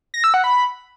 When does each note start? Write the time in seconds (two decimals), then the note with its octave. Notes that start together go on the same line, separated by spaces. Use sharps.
0.14 A#6
0.24 E6
0.34 F#5
0.44 B5